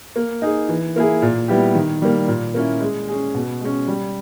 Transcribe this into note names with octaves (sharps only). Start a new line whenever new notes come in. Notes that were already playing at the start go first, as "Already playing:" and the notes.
A#3
D#4 G#4
E3
A#3 E4 G#4
A#2
G3 B3 E4 G4
D#3
G3 A#3
A#2
A#3 C#4 E4
G#3
C#4 G#4
B2
G#3 C#4
G3